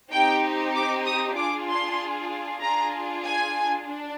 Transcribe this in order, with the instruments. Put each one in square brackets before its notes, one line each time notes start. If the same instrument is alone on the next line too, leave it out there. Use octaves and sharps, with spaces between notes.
[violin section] C4 D#4 G4 G5
D6
D#6
D4 F4 G#4 D6
C6
D4 F4 G#4 A#5
G#5
D4